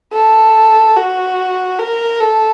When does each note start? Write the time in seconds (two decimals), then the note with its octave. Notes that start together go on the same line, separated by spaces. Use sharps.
0.13 A4
0.96 F#4
1.79 A#4
2.20 A4